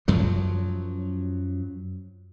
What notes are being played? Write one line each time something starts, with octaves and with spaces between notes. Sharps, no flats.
F#2 F3 F#3